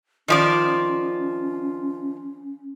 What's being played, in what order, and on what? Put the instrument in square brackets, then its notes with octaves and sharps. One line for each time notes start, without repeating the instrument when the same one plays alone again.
[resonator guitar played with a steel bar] D#3 F3 D5 [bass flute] C#4